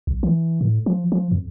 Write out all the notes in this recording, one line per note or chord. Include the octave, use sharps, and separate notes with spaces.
B1
E3
A2
F3
F3
F2